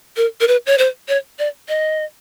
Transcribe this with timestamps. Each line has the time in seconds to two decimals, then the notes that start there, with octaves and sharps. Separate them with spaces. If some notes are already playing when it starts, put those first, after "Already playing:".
0.17 A#4
0.41 A#4
0.48 B4
0.66 C#5
0.78 C5
1.08 C#5
1.39 D5
1.69 D#5